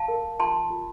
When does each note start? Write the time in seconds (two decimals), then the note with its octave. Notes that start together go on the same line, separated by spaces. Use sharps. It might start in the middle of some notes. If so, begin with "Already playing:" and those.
Already playing: F5 A5
0.08 A#4
0.40 F4 A5 C6
0.70 F4